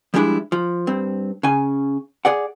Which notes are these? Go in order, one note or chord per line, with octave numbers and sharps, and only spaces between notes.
F3 G3 G#3 D4 E4
F3
G2 C4
C#3 G#5
G#4 D5 F#5